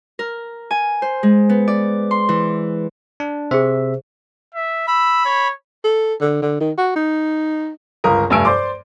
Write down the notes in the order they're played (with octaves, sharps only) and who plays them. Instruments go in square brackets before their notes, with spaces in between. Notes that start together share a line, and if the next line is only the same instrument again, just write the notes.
[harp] A#4
G#5
C5
G#3
B3
D5
C6
E3
[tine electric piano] D4
[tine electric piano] C3 E5 [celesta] G#4 C5
[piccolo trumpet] E5
[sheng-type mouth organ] B5 [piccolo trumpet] E6
[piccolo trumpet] C#5
[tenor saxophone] A4
D3
D3
D#3
F#4
D#4
[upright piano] G1 C#2 A#4 D#6
F1 G2 A3 G#5 E6 D7
C5 D5 C6 D6